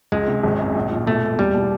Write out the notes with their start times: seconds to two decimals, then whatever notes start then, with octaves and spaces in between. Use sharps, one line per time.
0.12 C#2 G#3
0.28 C3
0.43 G#1
0.59 F#2
0.75 A#1
0.92 A#2
1.06 B2 A3
1.23 G#3
1.38 E2 G3
1.54 B2